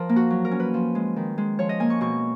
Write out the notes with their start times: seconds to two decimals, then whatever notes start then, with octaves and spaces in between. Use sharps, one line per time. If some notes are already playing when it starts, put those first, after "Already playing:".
Already playing: F3 A#4
0.09 A#3
0.16 F#4
0.30 F#3
0.45 A#4
0.51 C#4
0.60 B4
0.74 F3
0.95 G#3
1.16 D#3
1.38 G#3
1.59 F3 C#5
1.69 D#5
1.80 A#3 G#5
1.90 C#6
2.01 B2 C#6